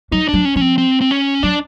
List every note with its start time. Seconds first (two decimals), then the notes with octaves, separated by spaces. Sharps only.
0.12 F#3 D#4
0.28 F#3 D4
0.45 C#4
0.56 F3 C#4
0.61 C4
0.78 C4
1.01 C4
1.11 C#4
1.43 F#3 D4